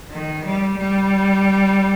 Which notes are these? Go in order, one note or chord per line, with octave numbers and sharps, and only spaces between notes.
D#3
G3
G3